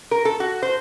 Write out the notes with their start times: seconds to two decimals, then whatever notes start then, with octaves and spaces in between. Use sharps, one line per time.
0.11 A#4
0.25 A4
0.40 F#4
0.62 C5